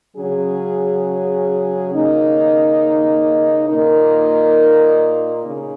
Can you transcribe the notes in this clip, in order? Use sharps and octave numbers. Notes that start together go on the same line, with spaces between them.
C#3 F#3 C#4 G#4
C#3 A#3 D#4
A#2 A#3 D#4 A#4
C#3